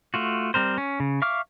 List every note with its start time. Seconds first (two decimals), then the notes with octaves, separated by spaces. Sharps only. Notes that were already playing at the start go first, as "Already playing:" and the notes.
0.14 A3 F4 F#4
0.54 G3 C4 A#4 C5
0.78 C#4
1.00 C#3
1.22 E5 F5 C#6 D6 F6